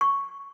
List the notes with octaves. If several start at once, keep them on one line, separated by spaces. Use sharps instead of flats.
C#6